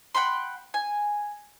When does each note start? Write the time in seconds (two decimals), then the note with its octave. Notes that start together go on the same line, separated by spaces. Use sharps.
0.15 F#5 G5 B5 C6
0.74 G#5